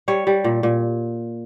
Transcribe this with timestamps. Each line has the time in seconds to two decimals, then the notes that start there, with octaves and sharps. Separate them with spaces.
0.08 G3 C#5
0.27 G3
0.44 A#2
0.63 A#2